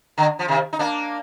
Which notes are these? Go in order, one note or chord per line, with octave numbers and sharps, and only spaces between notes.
D3
F3
C3 D#3
D#4
A#3 D4